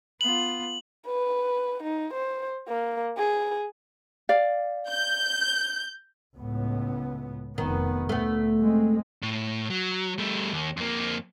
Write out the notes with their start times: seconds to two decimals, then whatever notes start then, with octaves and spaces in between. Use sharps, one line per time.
0.21 B3 F4 F#7
1.07 B4
1.83 D#4
2.14 C5
2.68 A#3
3.18 G#4
4.29 D5 F5
4.90 G6
6.37 C#2 A2 B3
7.58 F1 D#3 B3
8.09 D2 A#2 A3 B3
8.61 G#3 C4
9.22 A2
9.70 F#3
10.18 G3 A3
10.52 D#2
10.77 F2 A#3